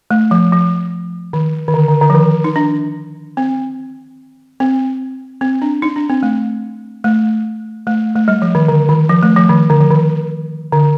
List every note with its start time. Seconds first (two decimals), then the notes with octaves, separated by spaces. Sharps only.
0.11 A3
0.31 F3
0.52 F3
1.33 D#3
1.68 D#3
1.74 D3
1.88 D3
2.01 D3
2.10 F3
2.14 D#3
2.44 D#4
2.56 D4
3.37 C4
4.60 C4
5.41 C4
5.62 D4
5.82 D#4
5.96 D4
6.09 C4
6.23 A3
7.04 A3
7.87 A3
8.16 A3
8.28 G3
8.42 F3
8.55 D#3
8.68 D3
8.89 D#3
9.09 F3
9.23 A3
9.36 F3
9.50 D#3
9.70 D3
9.80 F3
9.91 D#3
10.72 D3